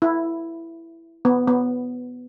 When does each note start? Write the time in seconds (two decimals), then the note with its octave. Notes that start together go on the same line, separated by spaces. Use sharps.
0.02 E4
1.25 B3
1.48 B3